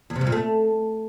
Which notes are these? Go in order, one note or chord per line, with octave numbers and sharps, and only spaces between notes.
E2
C3
G2
A#2
A3